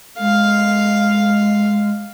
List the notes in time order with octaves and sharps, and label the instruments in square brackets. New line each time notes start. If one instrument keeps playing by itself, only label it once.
[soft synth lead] G#3 [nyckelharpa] F5